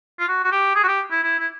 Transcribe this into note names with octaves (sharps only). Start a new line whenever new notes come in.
F4
F#4
F#4
G4
G#4
F#4
G4
E4
E4
E4